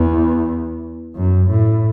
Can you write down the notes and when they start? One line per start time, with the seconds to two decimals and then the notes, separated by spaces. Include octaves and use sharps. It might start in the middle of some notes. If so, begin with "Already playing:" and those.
Already playing: E2
1.16 F#2
1.50 A2